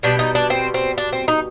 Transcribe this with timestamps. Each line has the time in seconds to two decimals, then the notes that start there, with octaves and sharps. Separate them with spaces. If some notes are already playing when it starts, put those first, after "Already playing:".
0.03 B2 G3 D4
0.19 D#4
0.35 D4
0.50 C4
0.74 C4
0.98 D4
1.13 C4
1.28 D#4